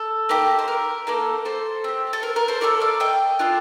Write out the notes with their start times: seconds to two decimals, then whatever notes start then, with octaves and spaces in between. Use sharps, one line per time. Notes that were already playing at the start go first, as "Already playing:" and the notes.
Already playing: A4
0.29 A#3 D#4 G4
0.59 C5
0.68 A#4
1.07 A#3 D#4 A4
1.45 A4 C5
1.84 C4 G4
2.13 A4
2.23 A#4
2.36 A#4
2.48 A4 C5
2.61 A3 D4 A4 A#4 D5
2.80 D5 F5
3.00 D#5 G5
3.39 D4 F4 A4